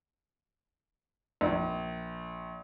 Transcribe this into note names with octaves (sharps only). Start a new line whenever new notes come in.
A#1